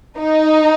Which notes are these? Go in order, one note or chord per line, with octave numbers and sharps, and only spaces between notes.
D#4